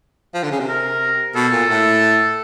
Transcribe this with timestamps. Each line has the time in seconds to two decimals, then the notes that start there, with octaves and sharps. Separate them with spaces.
0.34 F3
0.43 D3
0.51 C#3
0.60 C3
0.68 A#4
1.35 B2 A4
1.52 A#2
1.69 A2